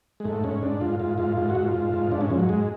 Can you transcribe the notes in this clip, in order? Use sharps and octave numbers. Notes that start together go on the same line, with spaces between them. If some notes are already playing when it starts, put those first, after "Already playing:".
G#3
G#2 A3
G#2 C#4
G#2 D4
G#2 F4
G#2 F4
G#2 F4
G#2 F4
F#4
G#2
F4
G#2
G#2
G#2 D4
C#4
G#2 F3
F#3
G#2 G#3